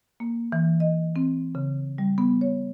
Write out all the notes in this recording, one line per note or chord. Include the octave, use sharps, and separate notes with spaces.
A#3
E3
D#5
C4
C#3
G3
B3
C#5